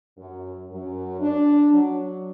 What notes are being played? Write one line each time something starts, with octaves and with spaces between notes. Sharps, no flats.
F#2
F#2
D4
F#3